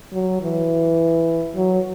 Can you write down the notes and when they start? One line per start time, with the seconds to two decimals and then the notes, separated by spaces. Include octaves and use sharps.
0.13 F#3
0.41 E3
1.56 F#3